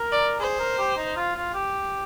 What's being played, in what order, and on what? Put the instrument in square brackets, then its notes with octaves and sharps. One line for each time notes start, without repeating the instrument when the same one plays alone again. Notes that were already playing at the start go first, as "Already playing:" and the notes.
Already playing: [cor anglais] A#4
[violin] D5
[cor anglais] G#4 [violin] C5
[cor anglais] A#4
G4
D#4
F4
F4
G4